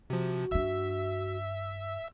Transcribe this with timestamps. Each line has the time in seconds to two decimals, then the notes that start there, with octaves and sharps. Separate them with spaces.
0.10 C3 F3 F#4
0.51 G2 D4 E5 E6